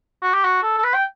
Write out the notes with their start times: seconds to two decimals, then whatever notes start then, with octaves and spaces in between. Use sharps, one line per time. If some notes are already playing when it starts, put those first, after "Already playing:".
0.23 F#4
0.34 G4
0.45 F#4
0.63 A4
0.78 A4
0.84 B4
0.94 G5